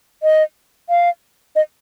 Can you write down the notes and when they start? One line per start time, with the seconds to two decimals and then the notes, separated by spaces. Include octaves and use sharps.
0.23 D#5
0.89 F5
1.56 D#5